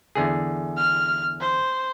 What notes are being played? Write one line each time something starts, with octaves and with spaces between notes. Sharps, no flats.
E2 D3 G#4
F6
C5